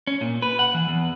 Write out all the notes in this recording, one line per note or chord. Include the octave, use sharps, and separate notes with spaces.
C#4
A#2
B4
F#5
E3
E2